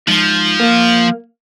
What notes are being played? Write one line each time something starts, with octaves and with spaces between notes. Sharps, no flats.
G#2 F3
A#3